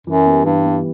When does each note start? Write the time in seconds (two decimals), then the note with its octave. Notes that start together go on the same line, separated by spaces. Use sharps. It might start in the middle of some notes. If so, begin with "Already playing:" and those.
0.07 F#2 E3
0.26 G3 B3
0.45 G2 E3
0.65 G3 B3